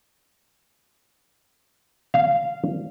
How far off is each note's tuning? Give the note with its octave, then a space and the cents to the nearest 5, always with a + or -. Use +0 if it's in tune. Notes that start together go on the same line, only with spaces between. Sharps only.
F5 -15